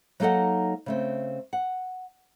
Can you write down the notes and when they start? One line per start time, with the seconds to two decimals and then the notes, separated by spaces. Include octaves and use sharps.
0.20 F#3 A#3 D#4 A4 D#5 F#5
0.86 C#3 A3 C4
1.53 F#5